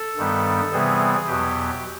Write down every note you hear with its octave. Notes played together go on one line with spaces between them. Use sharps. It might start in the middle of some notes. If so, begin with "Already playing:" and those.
Already playing: A4
G2 D#3 G3 B3
C3 E3 G3 B3 G#4
E2 B2 F#3 B3 G4